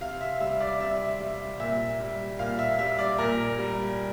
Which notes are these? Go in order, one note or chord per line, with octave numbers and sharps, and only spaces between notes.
C3 F5
E5
G3 E5
D5
C3 E5
G3
A#2 E5
G3
A#2 F5
E5
G3 E5
D5
A#2 A#4
G3